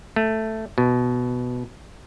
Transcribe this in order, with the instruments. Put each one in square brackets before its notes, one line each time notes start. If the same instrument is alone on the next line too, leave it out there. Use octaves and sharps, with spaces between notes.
[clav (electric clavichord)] A3
B2